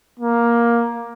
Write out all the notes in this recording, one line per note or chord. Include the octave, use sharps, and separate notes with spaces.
A#3